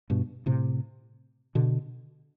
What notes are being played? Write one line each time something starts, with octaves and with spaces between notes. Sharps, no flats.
G2 B2
A2 C3
B2 D3